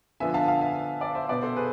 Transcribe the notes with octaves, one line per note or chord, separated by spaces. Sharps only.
D3 F3 B3 E5 G#5
F5 A5
F5 A5
E5 G#5
D5 F5
C5 E5
B2 B3 B4 D5
A4 C5
G#4 B4